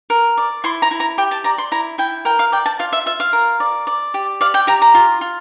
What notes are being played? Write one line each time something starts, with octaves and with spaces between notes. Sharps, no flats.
A#4
D5
E4 C6
A#5
E4
A#5
G4 G5
A5
D5 A#5
C6
E4 A#5
E4 G5
A#4 G5
F5
D5 G5
A5
F4 F5
E5
F4 E5
F5
A#4
D5
D5
G4
D5 F5
G5
G4 A#5
A#5
F4
F4